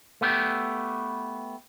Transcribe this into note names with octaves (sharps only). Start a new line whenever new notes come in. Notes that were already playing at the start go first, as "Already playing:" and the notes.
A3 B3 G4